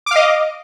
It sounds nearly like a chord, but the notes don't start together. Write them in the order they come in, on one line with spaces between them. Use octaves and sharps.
D6 F5 D#5